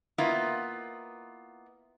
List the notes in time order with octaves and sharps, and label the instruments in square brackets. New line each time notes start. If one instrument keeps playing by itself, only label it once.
[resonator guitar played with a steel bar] A#3 B3 E4 F4 D#5